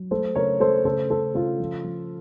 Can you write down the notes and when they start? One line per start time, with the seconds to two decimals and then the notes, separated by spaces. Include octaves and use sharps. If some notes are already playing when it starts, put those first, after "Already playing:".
Already playing: F#3
0.11 A3 A4 C5
0.35 C#3 A#4 C#5
0.60 A3 A4 C5
0.85 C#3 A4 C5
1.10 C#3 A4 C5
1.35 C#3 F4 A4
1.60 F3
1.84 F3